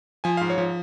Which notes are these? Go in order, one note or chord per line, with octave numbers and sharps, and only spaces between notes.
F3 G#5
G#2 F5
C#5
F3